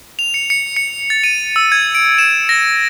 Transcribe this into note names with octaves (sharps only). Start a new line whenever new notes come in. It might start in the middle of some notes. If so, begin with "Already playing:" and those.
F7
C#7
C#7
C#7
A6
D#7
E6
G#6
D7
E7
A#6